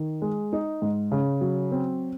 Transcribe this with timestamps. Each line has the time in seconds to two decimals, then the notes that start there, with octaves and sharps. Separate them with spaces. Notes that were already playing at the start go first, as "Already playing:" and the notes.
Already playing: D#3
0.22 G#3
0.53 D#4
0.82 G#2
1.12 C#3
1.41 F#3
1.72 C4